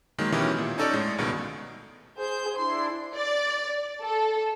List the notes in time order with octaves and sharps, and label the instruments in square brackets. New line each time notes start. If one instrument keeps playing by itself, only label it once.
[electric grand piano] D#3 F#3 G#3 A#3
B2 D#3 E3 C#4 E4 G4
A#2
C#4 D#4 A4 C#5 D5
A2 G#3
C#2 G2 B2 D#3 G#3
[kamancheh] G#4 C5 [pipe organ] G6
[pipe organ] D4 E4 [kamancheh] C6
[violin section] D5
A4